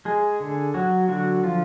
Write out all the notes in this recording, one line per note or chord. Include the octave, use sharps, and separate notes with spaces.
G#3 G#4
D3
F#3 F#4
D3 F#4
F3 F4